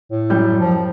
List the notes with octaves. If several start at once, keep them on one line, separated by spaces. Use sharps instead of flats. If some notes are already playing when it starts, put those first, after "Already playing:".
A2
F#2 G3 G6
F3